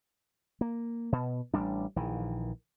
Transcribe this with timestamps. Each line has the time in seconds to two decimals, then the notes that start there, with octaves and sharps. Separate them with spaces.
0.61 A#3
1.12 B2
1.54 A1 G3 D4
1.96 A#1 D#3 E3